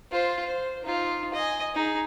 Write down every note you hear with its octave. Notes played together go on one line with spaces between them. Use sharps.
F4 C5
C5
D#4 F4
D#5 G#5
D#4 G#4